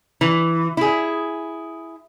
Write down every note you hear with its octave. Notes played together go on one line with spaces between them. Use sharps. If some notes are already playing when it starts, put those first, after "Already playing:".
E3
E4 G#4